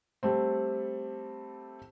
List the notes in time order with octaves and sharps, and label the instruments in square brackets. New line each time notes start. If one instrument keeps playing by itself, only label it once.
[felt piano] G3 A3 C4